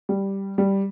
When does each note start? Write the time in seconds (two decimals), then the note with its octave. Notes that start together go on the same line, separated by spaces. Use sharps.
0.09 G3
0.58 G3